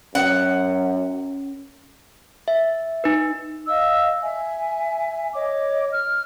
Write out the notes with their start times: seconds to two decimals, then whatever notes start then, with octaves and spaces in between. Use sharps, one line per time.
0.15 F#2 C#4 F#5
2.48 E5
3.04 D#4 B4
3.66 D#5 F5 E6
4.20 E5 G#5
5.33 C#5 D#5 D6
5.91 F6